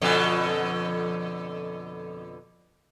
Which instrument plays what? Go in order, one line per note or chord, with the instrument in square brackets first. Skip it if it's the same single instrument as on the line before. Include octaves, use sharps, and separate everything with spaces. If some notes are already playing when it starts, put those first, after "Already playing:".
[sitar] F2 B2 D3